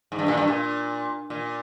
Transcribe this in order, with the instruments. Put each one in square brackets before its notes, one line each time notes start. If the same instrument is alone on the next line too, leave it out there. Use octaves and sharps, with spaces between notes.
[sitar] G#2
G2
A#2
G2
A#2
A#2